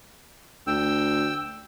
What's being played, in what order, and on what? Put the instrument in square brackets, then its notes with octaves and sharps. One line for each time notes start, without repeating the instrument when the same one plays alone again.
[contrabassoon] D2 [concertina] G5 E6